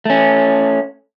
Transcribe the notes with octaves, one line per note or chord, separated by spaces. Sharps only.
A3 C#4